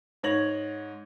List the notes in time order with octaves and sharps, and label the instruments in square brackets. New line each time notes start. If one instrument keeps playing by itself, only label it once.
[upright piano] G#2 C#5 G#6 A#6 F7 F#7